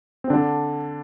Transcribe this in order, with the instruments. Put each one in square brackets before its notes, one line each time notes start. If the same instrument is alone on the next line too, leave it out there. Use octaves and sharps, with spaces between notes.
[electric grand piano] C4
D3 D4